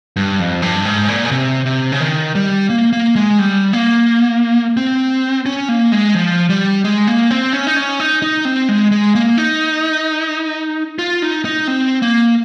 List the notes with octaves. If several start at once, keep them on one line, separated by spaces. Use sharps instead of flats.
G2
F2
G2
G#2
A#2
C#3
C3
C3
C#3
D#3
G3
A#3
A#3
G#3
G3
A#3
C4
C#4
A#3
G#3
F3
G3
G#3
A#3
C4
C#4
D#4
C#4
D#4
D#4
C4
G#3
G#3
A#3
D#4
F4
D#4
D#4
C4
A#3